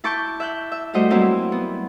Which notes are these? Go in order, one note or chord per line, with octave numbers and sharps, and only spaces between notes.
E4 A5 C#6 D6 G6
E5 F#6 G6
E5
G3 A3 F#4 C5 D#5 G5
F#3 G3 A#3 C4 E4 F#4
B3